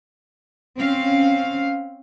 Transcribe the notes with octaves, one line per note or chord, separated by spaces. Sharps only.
C4 C#4 F5